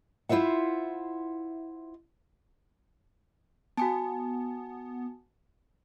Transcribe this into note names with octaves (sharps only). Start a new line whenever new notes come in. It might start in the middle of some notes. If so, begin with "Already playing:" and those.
E4 F4 C5 E5 F#5
B3 F#4 G#5 A5